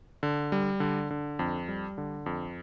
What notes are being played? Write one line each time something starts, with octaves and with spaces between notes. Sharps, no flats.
D3
G3
D3
D3
F2
G3
D3
F2